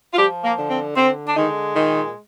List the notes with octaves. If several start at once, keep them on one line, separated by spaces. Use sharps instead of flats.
F4
F3 G3 G4
A#3
D3
C4
D3 C4
D4
D#3 G#3 D#4
A#2 D#3 D#4